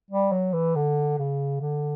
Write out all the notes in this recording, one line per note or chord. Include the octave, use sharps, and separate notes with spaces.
G3
F#3
E3
D3
C#3
D3